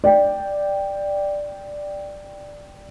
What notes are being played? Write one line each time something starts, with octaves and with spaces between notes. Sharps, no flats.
D5 G5